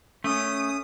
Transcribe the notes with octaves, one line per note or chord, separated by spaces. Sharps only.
A3 C#4 D#6